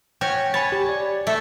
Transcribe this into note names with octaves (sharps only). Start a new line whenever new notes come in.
C#4 F#4 C#5 G5
C#5 G#5 B5 A6
G4
D5
A3 A4